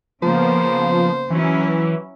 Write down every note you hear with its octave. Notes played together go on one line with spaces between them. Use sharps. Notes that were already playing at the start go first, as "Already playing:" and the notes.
C#3 F3 A#3 B3 C5
E3 F#3 C#4 E4